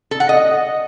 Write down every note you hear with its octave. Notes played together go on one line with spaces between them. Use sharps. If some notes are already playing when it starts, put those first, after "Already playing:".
A4
F#5
D#5